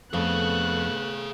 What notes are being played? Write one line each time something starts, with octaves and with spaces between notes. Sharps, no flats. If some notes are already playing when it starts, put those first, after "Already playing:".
F2 A3 B3 G#4 F5 F#6